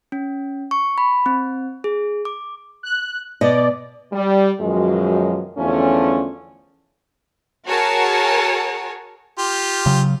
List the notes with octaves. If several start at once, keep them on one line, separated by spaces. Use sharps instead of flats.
C#4
C#6
B5
C4
G#4
D6
F#6
B2 D5 D#5
G3
F#2 B2 D#3 F3 F#3 G#3
E2 D3 F3 A3 C#4
F#4 G#4 A#4 C#5 A5
F4 G4
C#3 F#3